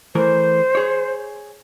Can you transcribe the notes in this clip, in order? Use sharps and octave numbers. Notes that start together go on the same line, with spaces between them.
E3 A3 A#4 C5
G#4 C#5